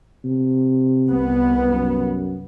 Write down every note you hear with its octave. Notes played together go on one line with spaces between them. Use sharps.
C3
C2 B3
F#2